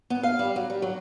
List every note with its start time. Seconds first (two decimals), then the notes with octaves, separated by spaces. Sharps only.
0.10 B3
0.23 F5
0.39 G3
0.56 F#3
0.70 G3
0.82 F#3